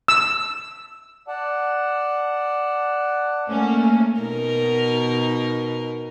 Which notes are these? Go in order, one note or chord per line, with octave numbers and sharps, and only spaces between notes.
E6
D5 F#5 A5
A3 A#3 C#4
B2 D#4 A#4